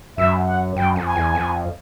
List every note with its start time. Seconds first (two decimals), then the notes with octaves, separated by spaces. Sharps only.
0.17 F#2 E5
0.47 F#5
0.76 F#2 G5
0.96 F2
1.06 G#5
1.15 E2
1.35 F2